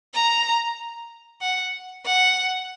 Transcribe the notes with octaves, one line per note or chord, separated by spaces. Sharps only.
A#5
F#5
F#5